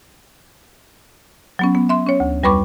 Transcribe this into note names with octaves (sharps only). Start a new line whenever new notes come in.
F#3 B3 C#4
B3
E5 C6
C#4 C#5
D2
F2 G3 B4 B5 C#6 D6